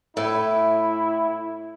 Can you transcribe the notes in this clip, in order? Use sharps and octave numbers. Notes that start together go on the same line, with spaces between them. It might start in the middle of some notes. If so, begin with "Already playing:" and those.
A2 E4